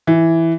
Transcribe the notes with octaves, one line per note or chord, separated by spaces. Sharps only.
E3